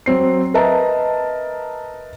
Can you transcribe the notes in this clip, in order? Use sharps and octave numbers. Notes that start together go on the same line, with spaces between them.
F#3 C4 C7
A#4 B4 D#5 E5 A5 A#5